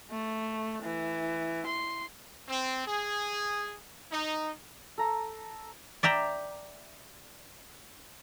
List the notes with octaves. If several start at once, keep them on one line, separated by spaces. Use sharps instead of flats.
A3
E3
C6
C4
G#4
D#4
A4 A#5
D5 E5 G5 A#5